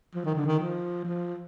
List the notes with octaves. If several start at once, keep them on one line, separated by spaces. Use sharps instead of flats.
F3
D#3
D3
D#3
F3
F3